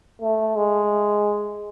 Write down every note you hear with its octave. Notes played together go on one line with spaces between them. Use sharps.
A3
G#3